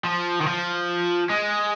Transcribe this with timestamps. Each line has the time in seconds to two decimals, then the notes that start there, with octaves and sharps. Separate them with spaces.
0.04 F3
0.41 D#3
0.47 F3
1.30 G#3